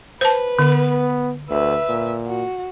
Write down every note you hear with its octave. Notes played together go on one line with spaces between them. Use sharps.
B4 C5 A5
D3 B3
D2 B4 E5
A#2
F#4